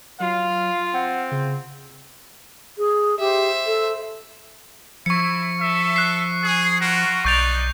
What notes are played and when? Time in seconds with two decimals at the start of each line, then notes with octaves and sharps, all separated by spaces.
0.20 F#3 F4 F5
0.94 C4 F#5
1.31 C#3
2.78 G#4
3.19 G4 C5 E5
3.66 A4
5.06 F3 E4 C#6 C#7
5.60 A4 E5
5.96 F#6 C7
6.43 G#4
6.80 F4 F#4 A#4
7.25 B1 D#4 D5 C#6 G6 F7